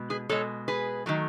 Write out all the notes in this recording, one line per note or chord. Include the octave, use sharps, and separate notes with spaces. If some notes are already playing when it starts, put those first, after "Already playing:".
Already playing: B2 G#3
G#4 B4
B2 G#3 A4 C#5
G#4 B4
D#3 F#3 A3